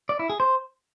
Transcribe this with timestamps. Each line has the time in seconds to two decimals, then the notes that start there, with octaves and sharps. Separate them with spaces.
0.09 D5
0.19 E4
0.30 G#4
0.40 C5